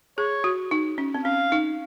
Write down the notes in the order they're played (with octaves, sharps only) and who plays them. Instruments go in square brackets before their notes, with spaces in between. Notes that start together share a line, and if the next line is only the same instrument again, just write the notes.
[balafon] G#4 [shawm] C#5
[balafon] F#4
D#4
C#4
C4
[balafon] C#4 [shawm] F5
[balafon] D#4